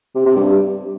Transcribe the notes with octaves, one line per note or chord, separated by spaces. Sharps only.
C3
C3
G2